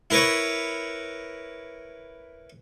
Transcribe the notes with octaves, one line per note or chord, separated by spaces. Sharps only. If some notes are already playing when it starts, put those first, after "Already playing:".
E4 A#4 B4 C#5